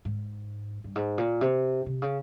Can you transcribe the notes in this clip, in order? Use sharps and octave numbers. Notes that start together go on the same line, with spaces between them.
G#2
G2
G#2
A#2
C3
C3
C#3